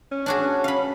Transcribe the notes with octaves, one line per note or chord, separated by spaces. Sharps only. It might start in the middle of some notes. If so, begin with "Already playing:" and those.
C#4
D4 F#4 G#4
F5 B5